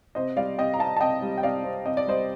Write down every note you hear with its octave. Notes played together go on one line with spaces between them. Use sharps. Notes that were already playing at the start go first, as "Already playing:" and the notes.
C3 C5 D#5
G3 D5 F5
C3 D#5 G5
A#5
C4 F5 A5
A5
C3 D#5 G5
G3
G5
C3 D5 F5
C4
C3 D#5
D5
G3 C5 D#5